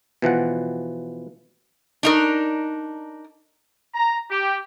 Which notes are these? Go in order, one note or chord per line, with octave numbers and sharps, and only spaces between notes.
B2 E3 F3 F#5
D4 D#4 A#4
A#5
G4